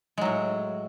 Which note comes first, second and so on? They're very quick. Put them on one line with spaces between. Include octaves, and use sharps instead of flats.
G#3 F#3 A2